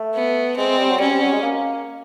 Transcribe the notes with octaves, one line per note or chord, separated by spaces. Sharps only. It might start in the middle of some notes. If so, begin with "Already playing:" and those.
Already playing: A3
B3
G#3 C4
G3
F#3
G3 C#4
G3
F#3
G#3
A#3